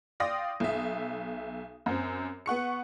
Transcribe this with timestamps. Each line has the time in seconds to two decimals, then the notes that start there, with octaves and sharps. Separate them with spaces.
0.20 D5 F5 G5 C6 D#6 A#6
0.60 B1 E5
1.86 F#2 C4
2.46 B3 F#5 C#6 C#7